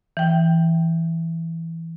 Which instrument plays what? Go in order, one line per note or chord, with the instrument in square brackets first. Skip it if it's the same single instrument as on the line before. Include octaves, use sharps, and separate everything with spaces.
[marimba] E3 G5